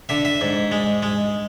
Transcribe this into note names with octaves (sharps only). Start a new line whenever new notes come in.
D3 E5
E5
G#2
G#3
G#3